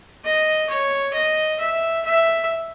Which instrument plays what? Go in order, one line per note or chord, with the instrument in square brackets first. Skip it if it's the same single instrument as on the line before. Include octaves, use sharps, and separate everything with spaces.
[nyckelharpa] D#5
C#5
D#5
E5
E5